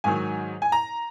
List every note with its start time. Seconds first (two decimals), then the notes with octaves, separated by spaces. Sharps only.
0.04 G#2 D#3 F#3 G#5
0.62 G#5
0.72 A#5